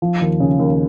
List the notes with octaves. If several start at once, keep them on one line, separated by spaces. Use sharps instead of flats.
F3
D#2
C#3
D#2